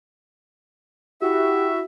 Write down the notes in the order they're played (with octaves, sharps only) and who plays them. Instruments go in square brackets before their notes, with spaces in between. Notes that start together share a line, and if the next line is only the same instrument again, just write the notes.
[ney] E4 [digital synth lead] F#4 [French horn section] G4 [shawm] E5